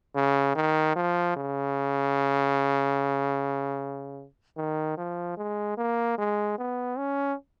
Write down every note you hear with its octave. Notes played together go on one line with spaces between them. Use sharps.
C#3
D#3
F3
C#3
D#3
F3
G#3
A#3
G#3
B3
C#4